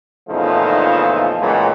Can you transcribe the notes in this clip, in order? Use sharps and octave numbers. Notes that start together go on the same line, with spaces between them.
E2 A#2 C#3 F3 A3 D#4
A#2 C#3 E3 F#3 G#3